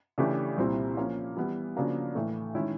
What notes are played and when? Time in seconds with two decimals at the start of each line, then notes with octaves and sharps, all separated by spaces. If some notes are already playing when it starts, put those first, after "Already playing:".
0.18 C#3 E3 A3 D4 G4
0.58 C2 A#2 G3 C4 E4
0.97 F3 A#3 C#4
1.37 E3 G3 B3 E4
1.76 C#3 F3 A#3 D4 F#4
2.15 A2 E3 A3
2.55 D#3 G#3 C#4 E4